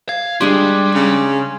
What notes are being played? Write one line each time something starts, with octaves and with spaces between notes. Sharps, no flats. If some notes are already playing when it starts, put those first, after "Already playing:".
F5 G#6
G3 G#3 D4 G4 C6
C#3